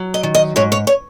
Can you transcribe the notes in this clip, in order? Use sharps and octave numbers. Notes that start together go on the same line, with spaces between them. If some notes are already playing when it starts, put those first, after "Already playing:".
Already playing: F#3
D#5
D#3
D#5
G#2 C#5
C#5
C#5